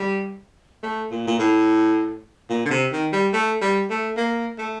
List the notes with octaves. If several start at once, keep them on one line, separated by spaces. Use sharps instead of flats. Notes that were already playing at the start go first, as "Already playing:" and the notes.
Already playing: G3
A3
A#2
A#2
A2
A#2
D3
C3
D#3
G3
A3
G3
A3
A#3
A3